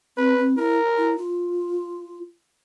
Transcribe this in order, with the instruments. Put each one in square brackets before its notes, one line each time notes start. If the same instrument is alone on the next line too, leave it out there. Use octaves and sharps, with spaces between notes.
[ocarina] C4 [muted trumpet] B4
[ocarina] C4
[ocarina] E4 [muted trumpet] A#4
[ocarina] E4
F4